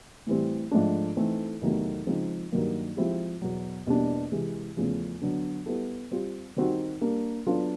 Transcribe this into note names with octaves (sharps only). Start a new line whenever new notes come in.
A2 E3 G3 C4
G#2 F3 A3 D4
E3 A3 C4 D#4
E2 C3 D#3 F#3 A3
C#3 F3 G#3 C4 D#4
G2 D#3 F#3 A#3
F3 G#3 C4 E4 G4
E2 B2 F#3
E2 B2 G3 A#3 D4
C3 E3 G#3
E2 C#3 F3 A3
D3 F#3 B3 D4
G3 B3 E4 A4
G3 C4 F4
D#3 G3 C4 D#4 F#4
G3 A#3 D4
F#3 B3 D4 F4 A4